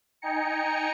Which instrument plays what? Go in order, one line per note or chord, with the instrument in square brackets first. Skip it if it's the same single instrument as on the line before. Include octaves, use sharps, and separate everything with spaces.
[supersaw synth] D#4 G5 G#5 A#5 C#7